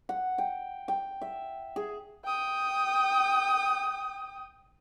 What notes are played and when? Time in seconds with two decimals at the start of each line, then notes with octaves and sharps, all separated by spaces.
0.09 F#5
0.38 G5
0.88 G5
1.21 E5
1.76 G#4
2.24 G5 D#6